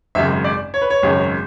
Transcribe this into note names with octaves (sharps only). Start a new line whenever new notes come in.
G#1 F#2 C#3 G#3 E5
D5
C#5
B4
C#5
G#1 F#2 C#3 G#3